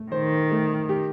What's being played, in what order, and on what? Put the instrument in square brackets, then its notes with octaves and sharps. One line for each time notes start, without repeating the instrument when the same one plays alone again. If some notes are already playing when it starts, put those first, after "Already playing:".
Already playing: [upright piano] A3
[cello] D#3 [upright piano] C5
[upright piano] A3
G4